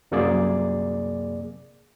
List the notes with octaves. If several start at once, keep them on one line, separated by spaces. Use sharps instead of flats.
C2 F#2 C3 A#3 G#4 D5